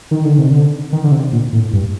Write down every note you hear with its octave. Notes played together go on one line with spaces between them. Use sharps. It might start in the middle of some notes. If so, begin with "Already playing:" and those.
D#3
D3
C3
D3
D#3
D3
C3
A#2
A2
G2